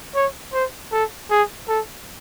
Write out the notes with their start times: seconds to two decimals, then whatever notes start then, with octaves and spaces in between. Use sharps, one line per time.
0.15 C#5
0.53 C5
0.92 A4
1.31 G#4
1.68 A4